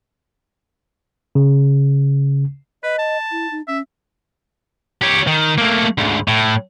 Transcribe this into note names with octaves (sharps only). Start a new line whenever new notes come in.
C#3
B4 D#5
A5
E4
D#4
C#4 E5
G4 C#5
D#3
A3 A#3
D2 G#2
A2